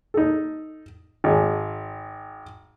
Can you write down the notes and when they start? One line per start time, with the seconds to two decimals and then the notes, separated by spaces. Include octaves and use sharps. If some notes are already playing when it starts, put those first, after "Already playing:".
0.14 D#4 A4
1.24 G#1 G#4